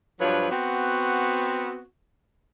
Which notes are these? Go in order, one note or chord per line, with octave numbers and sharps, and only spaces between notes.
G2 F3 F#3 B4 C#5
B3 C4 F#4